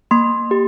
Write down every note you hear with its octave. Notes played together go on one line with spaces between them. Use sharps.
A#3 C6
G4